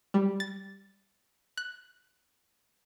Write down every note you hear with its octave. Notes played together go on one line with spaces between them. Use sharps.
G3
A6
F#6